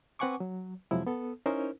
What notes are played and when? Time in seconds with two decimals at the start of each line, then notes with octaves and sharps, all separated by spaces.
0.19 C4 B4 F#5 G#5 C#6 D6
0.40 F#3
0.91 F2 C3 F3 F#3 G#3 E4
1.07 B3 A4
1.46 C#4 D#4 E4 A#4 C5